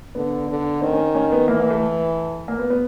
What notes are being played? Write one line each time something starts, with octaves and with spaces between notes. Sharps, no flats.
D3 B3
D3
D#3 C4
C#4
C#4
B3
E3 A#3
A#3
A3
A3
A#3
B3
B3